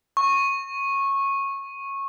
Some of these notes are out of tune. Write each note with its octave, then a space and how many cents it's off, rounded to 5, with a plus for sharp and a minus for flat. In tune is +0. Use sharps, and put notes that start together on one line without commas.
C#6 -15